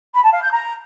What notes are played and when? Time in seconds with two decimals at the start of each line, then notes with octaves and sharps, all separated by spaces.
0.14 B5
0.24 A5
0.33 F5
0.43 G6
0.52 A#5